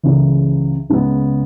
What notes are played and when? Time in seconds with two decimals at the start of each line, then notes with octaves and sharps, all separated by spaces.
0.03 C#2 C#3 E3
0.90 C#2 C#3 G#3 B3